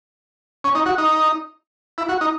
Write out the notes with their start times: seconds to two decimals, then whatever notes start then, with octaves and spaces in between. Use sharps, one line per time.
0.64 C#4
0.75 D#4
0.86 F#4
0.98 D#4
1.98 E4
2.09 F#4
2.21 D#4